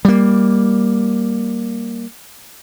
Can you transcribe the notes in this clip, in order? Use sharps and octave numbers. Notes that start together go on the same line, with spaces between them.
G3 A#3